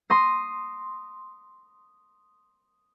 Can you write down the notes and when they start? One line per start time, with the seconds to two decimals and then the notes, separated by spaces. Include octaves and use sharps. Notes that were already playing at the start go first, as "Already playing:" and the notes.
0.10 C6 D#6 A#6